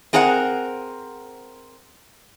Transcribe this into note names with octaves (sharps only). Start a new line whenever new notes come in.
C4 G#4 A#4 C5 E5 F#5